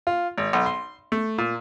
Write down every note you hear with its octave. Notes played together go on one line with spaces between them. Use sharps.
F4
G#1
B1
C6
A3
A#2